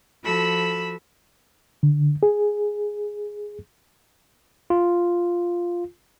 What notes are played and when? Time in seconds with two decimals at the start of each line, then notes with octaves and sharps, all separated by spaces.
0.24 F3 F#4 A4 B5 E6
1.83 D3
2.23 G#4
4.70 F4